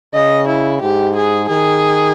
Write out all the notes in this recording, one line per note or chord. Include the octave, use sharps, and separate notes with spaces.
C#3 D#5
E4
G#2 G4
G#4
D#3 G#4